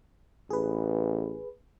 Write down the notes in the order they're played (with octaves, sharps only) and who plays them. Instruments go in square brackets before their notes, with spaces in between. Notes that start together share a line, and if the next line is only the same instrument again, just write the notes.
[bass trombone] A1 [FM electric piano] G#4 B4